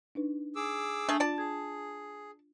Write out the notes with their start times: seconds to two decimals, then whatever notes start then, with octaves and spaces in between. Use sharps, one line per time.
0.15 D4 D#4 B4
0.56 G#4 D6 E6
1.09 A3 D4 G#4
1.20 F4 D5 A5
1.38 G#4 G#6